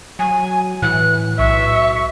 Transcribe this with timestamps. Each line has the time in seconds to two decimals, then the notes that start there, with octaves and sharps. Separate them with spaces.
0.19 F#3 G#5
0.82 A2 E3 F#6
1.39 B1 E5 C#6